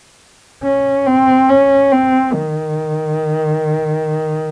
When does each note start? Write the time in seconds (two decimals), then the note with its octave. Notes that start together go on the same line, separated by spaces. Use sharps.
0.63 C#4
1.06 C4
1.49 C#4
1.92 C4
2.34 D#3